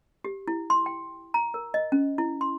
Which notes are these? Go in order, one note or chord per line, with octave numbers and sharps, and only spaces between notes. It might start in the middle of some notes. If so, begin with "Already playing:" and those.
G4
E4
C6
G5
A#5
A#4
D#5
C#4
E4
C6